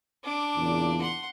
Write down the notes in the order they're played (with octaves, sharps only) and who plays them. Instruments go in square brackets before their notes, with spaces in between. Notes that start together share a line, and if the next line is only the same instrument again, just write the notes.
[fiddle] D4 D6
[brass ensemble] E2 A#2 C#3
[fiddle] F#5 C6